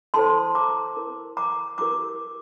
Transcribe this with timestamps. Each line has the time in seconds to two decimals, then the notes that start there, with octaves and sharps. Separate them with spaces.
0.14 E4 A4 C5 A5 C6
0.55 A#5 D6
0.97 E4 A#4
1.37 A#5 D6
1.78 E4 G4 A#4 A#5 D6